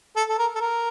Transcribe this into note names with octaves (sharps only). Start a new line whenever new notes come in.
A4
A4
A#4
A4
A#4